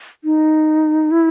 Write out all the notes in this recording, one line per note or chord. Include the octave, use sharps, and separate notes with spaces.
D#4
E4